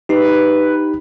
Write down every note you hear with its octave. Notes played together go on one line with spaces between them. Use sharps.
D#4 G4 B4